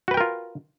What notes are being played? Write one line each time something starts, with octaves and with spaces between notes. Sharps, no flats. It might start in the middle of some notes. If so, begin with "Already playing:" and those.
F4 F#4 A#4 B4 G5